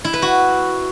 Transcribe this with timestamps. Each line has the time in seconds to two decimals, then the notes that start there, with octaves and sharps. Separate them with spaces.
0.04 E4
0.13 B4
0.22 F#4